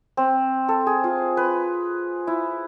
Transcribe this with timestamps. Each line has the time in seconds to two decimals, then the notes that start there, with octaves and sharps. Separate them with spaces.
0.17 C4
0.69 A4
0.87 G#4
1.04 F4
1.37 B4
2.27 E4